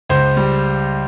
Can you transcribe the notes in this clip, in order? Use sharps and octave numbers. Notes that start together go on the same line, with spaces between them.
C#2 C5
G3